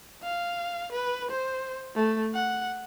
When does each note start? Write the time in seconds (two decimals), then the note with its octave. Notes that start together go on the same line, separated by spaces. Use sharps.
0.23 F5
0.92 B4
1.30 C5
1.95 A3
2.34 F#5